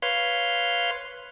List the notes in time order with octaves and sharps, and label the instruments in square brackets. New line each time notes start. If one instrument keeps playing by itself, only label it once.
[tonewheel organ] B4 C#5 F5 C6